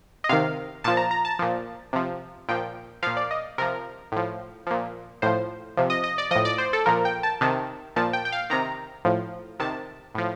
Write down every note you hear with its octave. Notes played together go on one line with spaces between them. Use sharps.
D#5
C3 D#3 F5
A#2 F3 A5
A#5
A#5
A5
A#2 F3
C3 F3
A#2 F3 G5
A#2 F3 F5
D5
D#5
C3 F3 A#4
A2 F3
A#2 F3
A2 F3 C5
C3 F3
D#5
D#5
D5
A2 F3 D#5
D5
C5
A4
A#2 F3 A#4
G5
A5
C3 D#3 A5
A#2 F3 A5
G5
G5
F5
C3 D#3 A#5
A2 F3
C3 D#3 A5
A2 F3